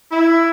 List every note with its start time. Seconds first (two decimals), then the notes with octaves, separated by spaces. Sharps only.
0.11 E4